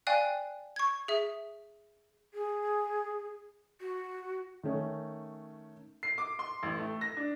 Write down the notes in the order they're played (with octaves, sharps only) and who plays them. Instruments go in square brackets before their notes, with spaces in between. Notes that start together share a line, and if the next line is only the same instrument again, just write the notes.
[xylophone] D5 F5 G5 G#5 F#6
C#6 G#6
G#4 E5
[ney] G#4
F#4
[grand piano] D#3 A3 C#4
[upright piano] C7
D6
C6
A1
A3
A#6
D4